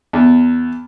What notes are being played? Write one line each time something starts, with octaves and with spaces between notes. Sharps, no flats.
E2